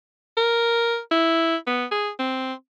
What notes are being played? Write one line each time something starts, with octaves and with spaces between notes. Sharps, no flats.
A#4
E4
B3
G#4
C4